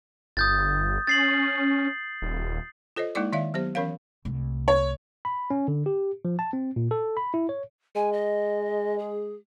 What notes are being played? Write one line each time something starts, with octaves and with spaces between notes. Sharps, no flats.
G1 D#6 G6 A6
C#4 A6 C7 F#7
D#1
F4 A4 C5 C#5 D#5
G#3 A#3 D#4 E4 D5 D6
D#3 D5 E5 F5
F#3 B3 G4 C5
E3 C#4 A#4 C#5 F5
C2 A3
C#5
B5
C#4
D3
G4
F3
A5
C4
A#2
A4
B5
E4
C#5
G#3 G#5
D#5
G#4